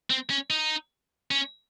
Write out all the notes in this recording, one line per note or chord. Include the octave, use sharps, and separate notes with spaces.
C4
C#4
D#4
C#4